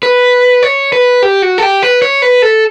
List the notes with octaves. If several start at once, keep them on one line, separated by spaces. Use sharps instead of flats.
B4
C#5
B4
G4
F#4
A4
G4
B4
C#5
B4
A4